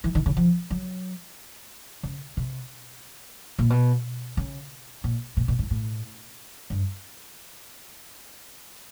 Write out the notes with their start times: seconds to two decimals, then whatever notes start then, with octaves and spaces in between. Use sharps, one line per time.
0.04 E3
0.15 D#3
0.26 C#3
0.37 F3
0.71 F#3
2.03 C#3
2.37 C3
3.59 A#2
3.70 B2
4.37 C#3
5.04 A#2
5.37 A#2
5.48 B2
5.59 G#2
5.71 A2
6.70 G2